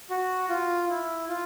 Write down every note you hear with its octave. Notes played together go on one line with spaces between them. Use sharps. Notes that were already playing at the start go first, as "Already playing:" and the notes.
F#4
F4
E4
F4